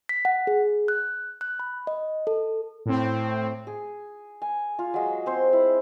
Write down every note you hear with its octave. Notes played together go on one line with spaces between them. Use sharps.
B6
F#5
G#4
F#6
F#6
B5
D#5
A4
A2 C4
G#4
G#5
F4
F#3 G#3
C4 C5
E4